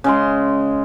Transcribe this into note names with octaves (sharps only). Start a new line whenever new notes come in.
C#3 G#3 C6